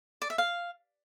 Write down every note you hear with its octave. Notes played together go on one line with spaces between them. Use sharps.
D5
E5
F5